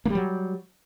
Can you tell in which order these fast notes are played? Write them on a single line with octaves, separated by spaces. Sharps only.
A#3 G3 F#3